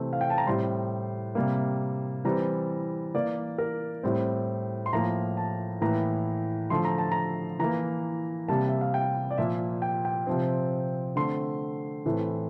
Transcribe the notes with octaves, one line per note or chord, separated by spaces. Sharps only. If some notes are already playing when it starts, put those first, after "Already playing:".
Already playing: C3 E3 A3 C4
F5
G5
A5
A#5
A2 G3 C4 C6
C3 G3 A#3
E3 G3 C4 A#5
E3 A#3 D5
A#4
A2 G3 C4
C6
A2 F3 A#3 A#5
A5
A2 E3 A#3 A#5
D3 F3 A3 C6
A#5
A5
A#5
E3 A#3 A#5
C3 G3 A#3 A5
E5
F5
G5
D5
A#2 F3 A#3 E5
G5
G5
C3 F3 C4
D3 A3 C4 C6
A2 E3 A3 C4